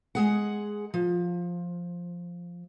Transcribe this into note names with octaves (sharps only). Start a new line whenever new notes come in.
G#3 G#4 F#5
F3